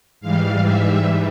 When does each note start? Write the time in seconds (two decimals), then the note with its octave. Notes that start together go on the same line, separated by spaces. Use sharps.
0.21 G#2 E3 G3 F5
0.64 E5